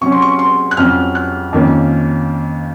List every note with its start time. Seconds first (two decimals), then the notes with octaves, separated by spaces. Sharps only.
0.01 C3 F#3 C#4 C#6
0.12 C6
0.22 C#6
0.39 C6
0.71 F#6
0.77 F2 C3 F#3 C#4 F6
1.15 F#6
1.53 F2 D#3 A#3 C#4